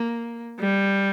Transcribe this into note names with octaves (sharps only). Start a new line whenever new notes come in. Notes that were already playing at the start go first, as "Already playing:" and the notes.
Already playing: A#3
G3